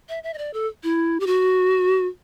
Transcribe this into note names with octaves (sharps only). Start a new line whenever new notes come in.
E5
E5
D#5
D5
A4
E4
G4
F#4